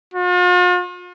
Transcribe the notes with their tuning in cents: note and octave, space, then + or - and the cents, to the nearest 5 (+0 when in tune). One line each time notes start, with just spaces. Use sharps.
F4 +45